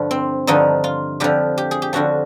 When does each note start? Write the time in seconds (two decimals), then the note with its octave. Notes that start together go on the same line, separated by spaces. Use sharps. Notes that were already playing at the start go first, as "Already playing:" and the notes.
Already playing: G2 D3 F3
0.11 C4
0.47 G2 D3 F3 D#4
0.84 F4
1.20 F2 D3 F3 G4
1.58 G4
1.71 G#4
1.82 G4
1.93 F2 D3 F3 F#4